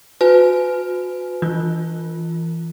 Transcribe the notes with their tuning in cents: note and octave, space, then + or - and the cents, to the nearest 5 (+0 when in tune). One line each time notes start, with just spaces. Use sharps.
F#4 -35 B4 +30 G#5 +30
E3 +0 F4 +0